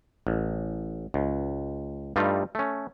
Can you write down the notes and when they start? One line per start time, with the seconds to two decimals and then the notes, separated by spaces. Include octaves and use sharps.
0.27 A1
1.14 C#2
2.16 G2 G3 A3 D#4 F4
2.55 A3 C#4